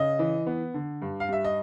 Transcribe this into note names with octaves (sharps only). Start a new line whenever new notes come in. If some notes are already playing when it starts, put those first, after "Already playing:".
Already playing: C#3 D#5
E3
B3
D3
G2
F5
G3 E5
D#5